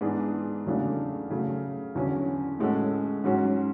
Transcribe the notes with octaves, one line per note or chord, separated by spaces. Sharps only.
G#2 E3 B3 D4 G#4
E2 C#3 F#3 A3 D4
C#3 F#3 A3
E2 D3 F#3 C#4
A2 G#3 C#4 F#4 A4
G#2 F#3 C#4 F#4